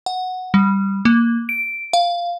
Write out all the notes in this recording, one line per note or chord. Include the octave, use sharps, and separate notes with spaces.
F#5
G3
A#3
D7
F5